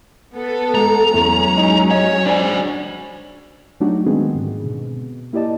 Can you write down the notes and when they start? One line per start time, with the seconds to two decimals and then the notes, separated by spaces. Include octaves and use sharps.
0.35 B3 A4
0.75 G#3 A#5
1.14 E2 F#3 G#3 C#4
1.57 D#4
1.91 C#5 D#5
2.26 D4 C5 D5 G#5
3.80 F#3 A3 D4 D#4 F#4 G4
4.06 D#3 G#3 B3 C4 G#4
4.35 G#2 D3
4.65 B2
5.33 A#3 E4 G4 D5 D#5 A5